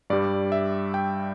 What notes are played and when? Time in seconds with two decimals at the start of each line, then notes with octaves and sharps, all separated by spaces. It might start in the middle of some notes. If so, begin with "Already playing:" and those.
0.10 G2 G3 D5
0.52 E5
0.94 G5